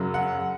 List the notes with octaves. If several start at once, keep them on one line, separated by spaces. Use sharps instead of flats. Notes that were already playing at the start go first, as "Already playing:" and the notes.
Already playing: F#2 C#3 F#3
F#5